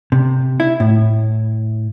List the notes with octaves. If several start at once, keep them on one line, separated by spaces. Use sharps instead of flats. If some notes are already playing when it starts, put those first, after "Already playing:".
C3
E4
A2